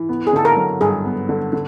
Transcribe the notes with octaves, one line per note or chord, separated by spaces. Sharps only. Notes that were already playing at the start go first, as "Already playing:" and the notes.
Already playing: E3
B3
G#4
D3 A4
A#4
F#3
G2 G#4
B3
D3
D3